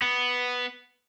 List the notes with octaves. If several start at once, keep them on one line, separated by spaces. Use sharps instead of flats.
B3